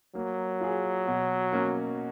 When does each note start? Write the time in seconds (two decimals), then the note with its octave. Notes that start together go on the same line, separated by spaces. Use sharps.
0.15 F#3 A#3
0.61 F4 G#4
1.07 B2
1.52 A#3 C#4 F#4